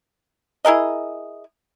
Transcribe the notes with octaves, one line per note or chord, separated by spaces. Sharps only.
E4 G#4 A#4 D#5